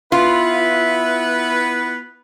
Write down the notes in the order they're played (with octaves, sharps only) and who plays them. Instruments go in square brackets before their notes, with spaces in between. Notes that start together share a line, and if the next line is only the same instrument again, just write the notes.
[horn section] B3 E4 B4 [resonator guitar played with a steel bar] F4 [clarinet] E5